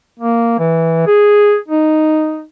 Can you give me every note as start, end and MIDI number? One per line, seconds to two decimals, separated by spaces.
0.19 0.58 58
0.59 1.04 52
1.07 1.56 68
1.68 2.44 63